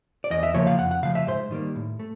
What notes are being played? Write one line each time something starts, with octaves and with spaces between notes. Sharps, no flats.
D5
E2 D#5
E5
C#3 F3 A#3 C#5
F5
F2 F#5
F#5
C#3 F3 A3 F5
E5
G#2 C5
D#3 G3 A#3
A2
A3